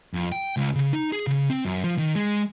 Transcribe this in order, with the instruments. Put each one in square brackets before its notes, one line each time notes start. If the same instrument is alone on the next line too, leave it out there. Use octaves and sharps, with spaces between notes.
[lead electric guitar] F2
G5
C#2
C#3
D#4
G#4
C#3
C4
F#2
F3
D#3
G#3